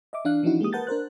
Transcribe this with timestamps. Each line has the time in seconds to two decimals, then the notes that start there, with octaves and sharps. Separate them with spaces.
0.13 D#5 E5 D6
0.25 E3 D4 F5 F#6
0.43 E3 F3 C#4 D#4 E4 F#4
0.61 G#3 A#3 G4 D#6
0.73 A#4 B4 F#5 A5 G6 A6
0.87 D4 A#4 C5 F#6